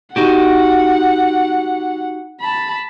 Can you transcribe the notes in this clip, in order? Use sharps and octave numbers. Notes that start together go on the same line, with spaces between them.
D#4 F#4 G4 F#5
A5 B5